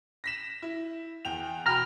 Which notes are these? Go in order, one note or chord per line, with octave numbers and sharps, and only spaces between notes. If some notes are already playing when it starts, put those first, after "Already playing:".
A#6 B6 E7
E4
E2 G5 F7
B2 G5 A#5 B5 F6